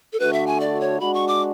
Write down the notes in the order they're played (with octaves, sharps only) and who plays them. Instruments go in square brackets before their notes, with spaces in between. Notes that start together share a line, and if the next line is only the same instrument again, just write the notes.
[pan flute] A4
[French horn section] D3 A3 D4 F#4 [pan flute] B4
[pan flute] E5
G#5
D5
C#5
[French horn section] G#3 D4 F#4 [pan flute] B5
[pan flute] C#6
D6